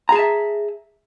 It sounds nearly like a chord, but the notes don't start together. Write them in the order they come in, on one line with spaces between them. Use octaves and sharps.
A#5 G#4 A5 E5